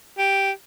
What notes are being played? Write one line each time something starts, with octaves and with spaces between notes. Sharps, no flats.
G4